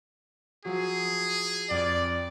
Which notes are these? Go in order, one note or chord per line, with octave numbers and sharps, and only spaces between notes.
F3 F#3 F#4 G#4
F2 D5 F#7